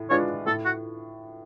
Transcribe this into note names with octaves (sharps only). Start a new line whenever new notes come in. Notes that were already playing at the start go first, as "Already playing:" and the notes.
Already playing: A2
G#3 D4 F4 B4 C#5
A2 A4
F#4